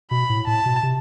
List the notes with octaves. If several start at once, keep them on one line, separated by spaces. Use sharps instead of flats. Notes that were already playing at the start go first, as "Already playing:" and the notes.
B2 B5
A2
A2 A5
B2
C3